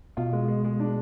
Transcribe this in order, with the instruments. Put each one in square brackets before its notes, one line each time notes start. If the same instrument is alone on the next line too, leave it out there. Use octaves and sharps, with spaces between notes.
[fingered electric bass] B2 [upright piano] F4
[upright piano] G#3
G#3
G#3
D4